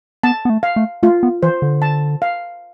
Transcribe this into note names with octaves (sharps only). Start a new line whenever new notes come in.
B3 A5
B3
A3
F5
A3
A3 F4
B3
E3 C5
D3
A5
F5